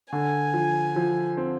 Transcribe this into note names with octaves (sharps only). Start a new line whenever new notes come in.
D3 G#5
F3
F3
C4